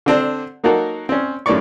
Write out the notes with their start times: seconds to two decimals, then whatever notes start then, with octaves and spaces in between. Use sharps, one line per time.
0.06 D3 C4 D4
0.64 F#3 A#3 D#4 F#4 A4 A#4
1.09 C4 C#4
1.46 F#2 A2 D#3 C#5 D5 C#6